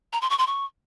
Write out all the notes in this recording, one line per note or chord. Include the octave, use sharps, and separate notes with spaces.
A#5
C6
C#6
C6
C#6